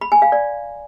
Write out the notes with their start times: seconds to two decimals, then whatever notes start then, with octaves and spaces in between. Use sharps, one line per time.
0.01 B5
0.12 G#5
0.22 F5
0.32 D5